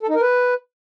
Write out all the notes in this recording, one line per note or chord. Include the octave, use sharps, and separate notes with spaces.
A4
D#4
A#4
B4